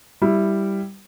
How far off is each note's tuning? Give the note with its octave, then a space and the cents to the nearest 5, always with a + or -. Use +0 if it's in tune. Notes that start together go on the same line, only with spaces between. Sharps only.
G3 +0 E4 +0